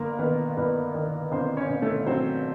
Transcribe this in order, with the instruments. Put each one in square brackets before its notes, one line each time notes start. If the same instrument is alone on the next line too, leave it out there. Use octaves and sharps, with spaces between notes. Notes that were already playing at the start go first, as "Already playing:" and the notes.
Already playing: [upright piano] G1 A#3 A#4
D#3 B3 B4
G2 B3 B4
D#3
G1 C4 C5
C#4 C#5
G1
A3 A4
F#3 C4 C5